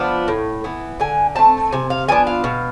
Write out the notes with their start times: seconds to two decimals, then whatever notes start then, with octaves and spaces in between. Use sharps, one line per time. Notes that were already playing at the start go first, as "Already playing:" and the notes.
Already playing: F3 B3 D4 F5
0.28 A2
0.64 E3 B3
1.00 D3 G#5
1.36 A3 C4 A5
1.72 C3 G#5
1.90 F5
2.09 F3 B3 D4 G#5
2.27 F5
2.44 B2